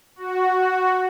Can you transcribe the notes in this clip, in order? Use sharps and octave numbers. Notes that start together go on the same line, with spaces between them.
F#4